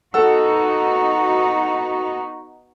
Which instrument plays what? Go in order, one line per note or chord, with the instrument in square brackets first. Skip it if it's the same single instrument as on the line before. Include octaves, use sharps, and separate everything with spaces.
[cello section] B3 D#4 F#4 [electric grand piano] A4 F#5 E6